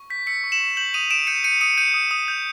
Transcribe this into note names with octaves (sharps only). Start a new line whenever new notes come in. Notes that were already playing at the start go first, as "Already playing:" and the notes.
Already playing: C#6
G6 B6
E6 B6 C#7
C#6
E7 F#7
C#6
G6 E7 F#7
D#6 D#7 F7
D#6 D7 E7
G6 C#7 D#7
G6 C#7 D#7
D#6 C#7 D#7
G6 C#7 D#7
D#6
D#6
G6